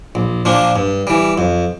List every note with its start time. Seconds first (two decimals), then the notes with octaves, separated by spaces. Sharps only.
0.15 A#1
0.45 A#2 F3 A#3 D4
0.76 G2
1.07 E3 G3
1.38 F2